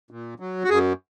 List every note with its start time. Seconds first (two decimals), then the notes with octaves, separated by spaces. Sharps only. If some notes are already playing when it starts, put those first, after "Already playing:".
0.11 A#2
0.40 F#3
0.64 F#4
0.69 F#2 G#4